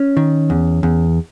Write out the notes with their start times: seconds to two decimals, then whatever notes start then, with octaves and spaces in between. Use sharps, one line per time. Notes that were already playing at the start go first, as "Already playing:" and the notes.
Already playing: C#4
0.17 D#3
0.50 E2
0.83 E2